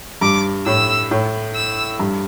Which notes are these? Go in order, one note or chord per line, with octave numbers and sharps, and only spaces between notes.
G2 D6
A2 E6
A2
E6
G2